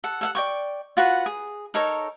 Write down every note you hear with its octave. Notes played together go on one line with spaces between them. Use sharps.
A4 F#5
A4 F5 F#5
D5 G5 C#6
F4 F#4 B4 F#5
G#4
D#4 A4 A#4 C#5